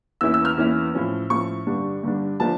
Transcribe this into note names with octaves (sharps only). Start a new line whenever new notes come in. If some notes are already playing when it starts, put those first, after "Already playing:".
E2 E3 A#3 C#4 E4 E6
E6
F6
E2 E3 A#3 C#4 E4
A2 F3 C#4
A2 F3 C#4 C#6
G2 D3 G3 D4
G2 D3 G3 D4
F3 A3 D4 A5